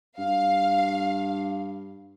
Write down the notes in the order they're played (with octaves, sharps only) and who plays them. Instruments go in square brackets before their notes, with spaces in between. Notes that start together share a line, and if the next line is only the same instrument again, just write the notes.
[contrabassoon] G2 [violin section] F5